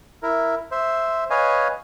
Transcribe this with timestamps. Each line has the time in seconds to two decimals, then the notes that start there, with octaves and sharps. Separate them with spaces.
0.23 E4 A#4
0.71 C5 E5
1.30 B4 C#5 D#5 F5 G#5